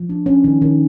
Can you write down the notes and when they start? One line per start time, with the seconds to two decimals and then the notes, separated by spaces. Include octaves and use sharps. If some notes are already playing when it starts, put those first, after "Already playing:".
Already playing: F3
0.09 D4
0.26 C#4
0.44 D#3
0.62 D#3